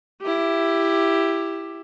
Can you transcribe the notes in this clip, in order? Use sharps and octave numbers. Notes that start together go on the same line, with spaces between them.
E4 G4